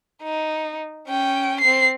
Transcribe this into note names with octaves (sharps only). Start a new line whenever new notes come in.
D#4
C#4 G5
C4 C7